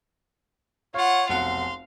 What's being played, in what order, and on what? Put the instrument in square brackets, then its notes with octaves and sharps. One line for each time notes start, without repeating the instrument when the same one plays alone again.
[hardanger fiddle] F4 F#5 [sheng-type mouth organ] C#5 [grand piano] F5
[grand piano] F1 B1 F#5 [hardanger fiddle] F5 [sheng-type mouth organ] C6